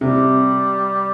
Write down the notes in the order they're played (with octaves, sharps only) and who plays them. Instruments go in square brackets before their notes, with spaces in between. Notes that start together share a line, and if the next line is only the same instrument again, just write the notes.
[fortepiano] C3 [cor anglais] G3